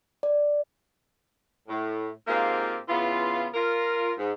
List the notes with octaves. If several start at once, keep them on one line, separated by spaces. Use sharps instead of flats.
D5
A2
G#2 A#3 C4 F4 G4 F5
C#3 E3 B3 F4
F4 A#4
G#2